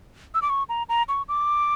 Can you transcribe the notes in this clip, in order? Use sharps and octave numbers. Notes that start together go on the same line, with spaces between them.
E6
D6
C#6
A#5
A#5
C#6
D6